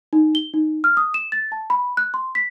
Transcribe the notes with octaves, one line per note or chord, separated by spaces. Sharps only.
D#4
G7
D#4
F6
D#6
E7
A6
A5
B5
F#6
C6
B6